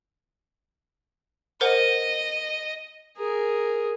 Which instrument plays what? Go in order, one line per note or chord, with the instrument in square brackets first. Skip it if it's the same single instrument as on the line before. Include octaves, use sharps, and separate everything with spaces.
[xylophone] A#4 C5 F#5 [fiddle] D#5
[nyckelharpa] G#4 A#4